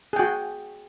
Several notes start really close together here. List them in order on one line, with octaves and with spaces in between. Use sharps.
G#4 G5 F#4